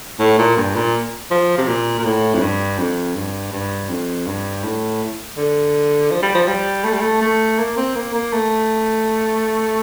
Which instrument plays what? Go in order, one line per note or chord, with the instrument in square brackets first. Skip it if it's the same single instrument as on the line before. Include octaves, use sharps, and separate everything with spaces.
[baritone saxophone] A2
A#2
G2
A#2
F3
C3
A#2
A#2
A2
F2
G2
F2
G2
G2
F2
G2
A2
D3
F3
G3
F3
G3
A3
G3
A3
A3
A#3
C4
A#3
A#3
A3